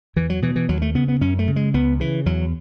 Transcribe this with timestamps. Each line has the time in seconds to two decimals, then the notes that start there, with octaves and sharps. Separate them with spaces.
0.16 E2 E3
0.30 F#3
0.42 B2 E3
0.56 E3
0.69 D#2 F#3
0.82 A3
0.95 C#3 B3
1.08 B3
1.21 F#2 C#4
1.39 A3
1.47 C#3
1.56 G#3
1.74 C#2 B3
2.00 C#3 E3
2.26 E2 F#3